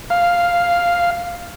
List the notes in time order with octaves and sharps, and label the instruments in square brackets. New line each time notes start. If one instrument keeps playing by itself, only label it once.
[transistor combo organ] F5